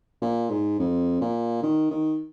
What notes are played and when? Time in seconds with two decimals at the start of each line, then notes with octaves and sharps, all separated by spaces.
0.22 A#2
0.50 G#2
0.79 F2
1.21 A#2
1.63 D#3
1.91 D#3